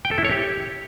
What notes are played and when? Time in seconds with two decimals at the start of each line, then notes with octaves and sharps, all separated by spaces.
0.05 G5
0.11 A4
0.18 E4
0.25 C#5
0.31 G4